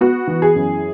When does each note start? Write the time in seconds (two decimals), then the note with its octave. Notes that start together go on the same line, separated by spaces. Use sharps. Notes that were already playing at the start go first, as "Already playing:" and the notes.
0.01 B3 F#4
0.27 E3
0.42 G#4
0.56 F#2